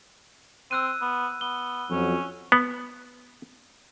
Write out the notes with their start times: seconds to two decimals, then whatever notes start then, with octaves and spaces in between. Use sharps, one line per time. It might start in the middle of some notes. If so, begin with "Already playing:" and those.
0.71 C4 E6 F#6 D#7
1.01 B3
1.41 B3 G7
1.90 F2 F#3 C#4
2.52 B3